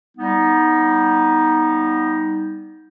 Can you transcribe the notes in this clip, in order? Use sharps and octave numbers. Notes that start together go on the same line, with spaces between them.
G3 B3 D#4